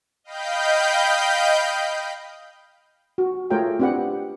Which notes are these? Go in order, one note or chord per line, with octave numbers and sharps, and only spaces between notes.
D#5 F5 G5 B5 G6
F#4
A3 F4 G#4 A#4 C#5 G5
C4 D4 G4 B4 F#5